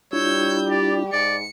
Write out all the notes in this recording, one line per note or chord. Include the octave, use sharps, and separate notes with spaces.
G3 D4 E4 F4 C#5 E6 G6
G4 D5
G#2 D5 C#7